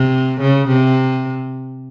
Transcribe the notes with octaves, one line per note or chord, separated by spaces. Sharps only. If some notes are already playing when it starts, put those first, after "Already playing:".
Already playing: C3
C#3
C3